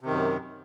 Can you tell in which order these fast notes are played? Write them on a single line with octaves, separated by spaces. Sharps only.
C3 D#3 F#2